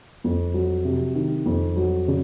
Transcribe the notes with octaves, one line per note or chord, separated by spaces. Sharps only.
F2
F#3
C3
D#3
F2
F#3
C#3